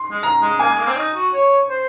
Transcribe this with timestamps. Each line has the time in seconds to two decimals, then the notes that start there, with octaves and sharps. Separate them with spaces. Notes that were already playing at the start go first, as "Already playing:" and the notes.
Already playing: C6
0.11 G#3
0.23 A#5
0.42 G#3
0.59 A#3 G#5
0.68 G#3
0.78 A#3
0.87 C4
0.96 D#4
1.15 F#4
1.33 C#5
1.70 C5